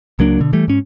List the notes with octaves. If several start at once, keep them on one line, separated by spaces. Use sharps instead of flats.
C#2 F#3 A#3 D4
B2 D3
E3 G3 A3
G#2 C#4